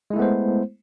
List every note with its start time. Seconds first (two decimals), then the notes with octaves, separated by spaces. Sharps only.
0.10 G#3
0.13 E4
0.16 A3
0.19 B3
0.22 C5